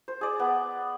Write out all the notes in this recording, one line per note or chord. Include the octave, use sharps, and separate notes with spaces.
C5
G#4 D5
B3